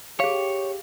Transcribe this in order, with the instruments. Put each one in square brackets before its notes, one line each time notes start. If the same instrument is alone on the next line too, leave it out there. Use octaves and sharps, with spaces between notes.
[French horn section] G4 [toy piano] G#4 F5 [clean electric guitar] C#5